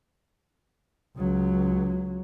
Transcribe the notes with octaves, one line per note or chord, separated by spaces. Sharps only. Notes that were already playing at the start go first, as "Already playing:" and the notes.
C#2 F#3